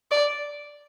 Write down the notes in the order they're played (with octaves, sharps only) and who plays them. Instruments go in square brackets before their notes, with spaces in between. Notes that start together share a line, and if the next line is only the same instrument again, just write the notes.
[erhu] D5